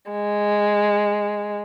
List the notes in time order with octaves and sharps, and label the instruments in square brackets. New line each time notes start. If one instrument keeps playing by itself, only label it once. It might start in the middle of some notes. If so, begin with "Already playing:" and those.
[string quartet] G#3